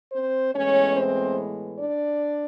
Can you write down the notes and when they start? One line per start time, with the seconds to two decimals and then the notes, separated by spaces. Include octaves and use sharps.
0.12 C4 C5
0.54 A2 E3 G#3 B3 C#4 C#5
0.95 C4 C5
1.79 D4 D5